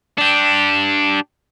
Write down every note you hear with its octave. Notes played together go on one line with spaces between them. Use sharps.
D4 G4